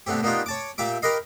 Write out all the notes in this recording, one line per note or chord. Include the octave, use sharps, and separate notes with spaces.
B2 D3 A3 C4 G4
A#3 B3 D4 D#4 F4 G4
C#5 A5 D6
A#2 G4 E5 D6
G4 A#4 B4 D#5 F5